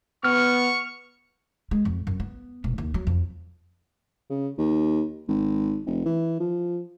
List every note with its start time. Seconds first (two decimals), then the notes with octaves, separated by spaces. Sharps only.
0.24 B3 C#6 F6
1.71 G#3
1.85 F2
2.07 F#2
2.20 B3
2.64 E1
2.78 D#2
2.94 F#3
3.07 F2
4.30 C#3
4.58 D#2
5.28 G#1
5.86 F1
6.05 E3
6.40 F3